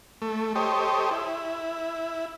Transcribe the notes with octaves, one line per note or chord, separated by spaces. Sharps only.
A3
G4 A4 C5 C#5 D#5
E4